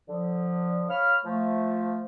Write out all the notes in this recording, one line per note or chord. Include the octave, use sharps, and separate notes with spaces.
D3 F3
C#5 F5 B5 F6
F3 A3